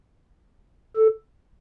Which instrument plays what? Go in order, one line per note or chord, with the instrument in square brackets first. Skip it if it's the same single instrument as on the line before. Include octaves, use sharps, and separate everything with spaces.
[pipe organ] A4